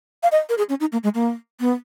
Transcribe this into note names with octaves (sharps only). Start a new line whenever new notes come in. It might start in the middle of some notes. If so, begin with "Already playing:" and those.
F5
D#5
A#4
G#4
C#4
D#4
A#3
G#3
A#3
B3